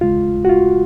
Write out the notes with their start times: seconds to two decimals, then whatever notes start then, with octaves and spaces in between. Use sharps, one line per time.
0.01 D#2 C#3 G#3 F4
0.45 F#4
0.49 F4